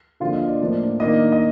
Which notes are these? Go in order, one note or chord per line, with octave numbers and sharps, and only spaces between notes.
D3 F3 A#3 D4 F4 F5
D#5
D5
A2 F3 A#3 D4
D#3 A#3 D4 D#5
D#5